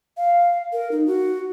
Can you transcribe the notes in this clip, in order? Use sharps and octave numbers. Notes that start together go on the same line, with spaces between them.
F5
A#4
D#4
F#4